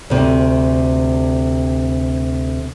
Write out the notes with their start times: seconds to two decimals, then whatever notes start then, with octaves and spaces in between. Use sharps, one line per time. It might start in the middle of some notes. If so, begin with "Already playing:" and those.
0.10 D2 C3